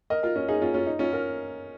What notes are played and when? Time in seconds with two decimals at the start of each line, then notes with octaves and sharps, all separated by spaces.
0.10 A#4 D#5
0.23 F4 A#4
0.36 C#4 F4
0.48 D#4 G#4
0.62 C#4 F4
0.74 C#4 F4
0.87 D#4
0.99 C#4 F4
1.12 F4 A#4